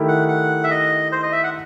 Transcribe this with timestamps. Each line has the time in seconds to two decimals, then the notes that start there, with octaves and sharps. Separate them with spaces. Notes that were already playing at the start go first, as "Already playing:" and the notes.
Already playing: D#3 A3 E4 G4
0.08 F#5
0.28 F#5
0.64 E5
0.71 D#5
1.12 C5
1.23 D#5
1.32 E5
1.44 F#5